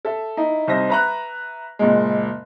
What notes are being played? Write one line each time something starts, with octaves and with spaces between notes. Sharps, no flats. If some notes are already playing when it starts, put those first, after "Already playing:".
A4 E5
D#4 E4
C2 D#4 C5 E5 A#6
B4 E5 A#5 C#6 F#6
F#1 A#2 G#3